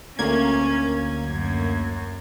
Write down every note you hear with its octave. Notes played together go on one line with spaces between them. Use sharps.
D2 A#3 C#4 G#6
F#2